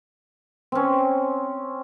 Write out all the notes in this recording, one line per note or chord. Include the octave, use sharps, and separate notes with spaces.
C4 C#4